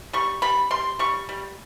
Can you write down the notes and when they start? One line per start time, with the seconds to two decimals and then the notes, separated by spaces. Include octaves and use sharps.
0.13 G3 C#6
0.42 G3 B5
0.71 G3 C6
0.99 G3 C#6
1.29 G3